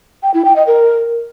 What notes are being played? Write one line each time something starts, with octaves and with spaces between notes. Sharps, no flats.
G5
E4
G5
D#5
A#4